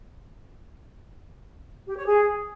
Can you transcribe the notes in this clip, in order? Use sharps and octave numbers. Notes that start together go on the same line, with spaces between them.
G4
C#5
G#4